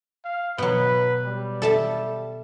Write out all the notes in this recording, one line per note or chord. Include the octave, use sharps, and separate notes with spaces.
F5
B2 F#3 B4
G3
A4 E5 A5